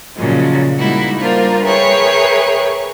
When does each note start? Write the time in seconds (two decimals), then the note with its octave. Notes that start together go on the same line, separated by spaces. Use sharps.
0.16 A#2 C#3 F3 F#3 G#3
0.77 G3 G#3 A#3 D#4 E4 F#4
1.20 G3 A#3 D4 F4 A#4 C5
1.63 G#4 A#4 B4 C#5 E5 G5